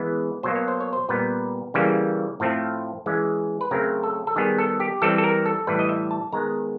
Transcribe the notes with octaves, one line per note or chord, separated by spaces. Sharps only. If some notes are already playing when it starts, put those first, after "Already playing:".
Already playing: E3 G#3 B3 B4
B2 F#3 A#3 C5
C#5
C5
C#5
C5
A#2 G3 B3 B4
C#3 E3 G3 A#3 C#4
A2 F3 A3 C4
E3 G#3 C#4
B4
C#3 F#3 A3 C4 A#4
A4
A4
D#3 G3 B3 G#4
A4
G4
E3 G3 C4 A4
A4
A#4
A4
A2 E3 G3 B4
D#5
E5
A5
D#3 G#3 B3 A#5